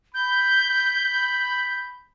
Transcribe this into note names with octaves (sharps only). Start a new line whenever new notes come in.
B5 G6